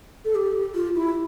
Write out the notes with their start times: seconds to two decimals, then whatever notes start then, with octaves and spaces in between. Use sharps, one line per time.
0.25 A4
0.35 G4
0.74 F4
0.95 E4